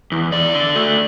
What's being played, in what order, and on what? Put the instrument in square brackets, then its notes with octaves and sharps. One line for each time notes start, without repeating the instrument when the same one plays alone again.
[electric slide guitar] E2
E2 D5
D3
A3